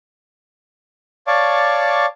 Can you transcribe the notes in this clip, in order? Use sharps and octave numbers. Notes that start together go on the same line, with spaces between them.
C#5 D5 F5 A5 C#6 D6